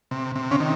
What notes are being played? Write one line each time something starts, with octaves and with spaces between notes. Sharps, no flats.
C3
C3
C#3 C#4
D#3